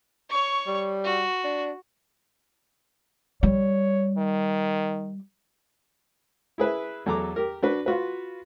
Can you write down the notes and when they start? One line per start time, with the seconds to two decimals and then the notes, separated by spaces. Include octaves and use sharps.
0.30 C#5 C#6
0.67 G3
1.05 F#4
1.44 D4
3.43 G3 C#5
4.18 D#3
6.58 E4 G#4 B4 E5
7.06 E2 F#3 A4 A#5 D6
7.36 G4 A#4
7.63 D4 F#4 B4
7.86 F4 F#4 B4